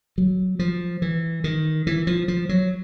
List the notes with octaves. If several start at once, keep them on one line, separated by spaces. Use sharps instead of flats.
F#3
F3
E3
D#3
E3
F3
F3
F#3